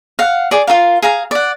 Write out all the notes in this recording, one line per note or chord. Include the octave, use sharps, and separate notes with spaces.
F5 F#5
G#4 D5
F4 F#4 A#4 F5
G#4 F5 A#5
D5 F#5